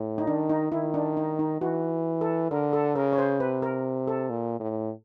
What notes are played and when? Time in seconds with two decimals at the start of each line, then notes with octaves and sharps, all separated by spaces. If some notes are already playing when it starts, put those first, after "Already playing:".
Already playing: A2
0.18 D#4
0.27 D#3 D4
0.50 D#4
0.72 D#3 E4
0.94 D4
1.17 D#4
1.39 D#4
1.61 E3 F#4
2.21 A4
2.51 D3 A#4
2.73 A4
2.96 C#3 A#4
3.13 C#5
3.18 C5
3.40 C3 B4
3.62 A#4
4.07 A4
4.30 A#2
4.60 A2